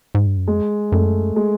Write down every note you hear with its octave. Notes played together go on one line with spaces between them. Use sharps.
G#2
G2
F#2
F2 G#3
F#2 A3
G#3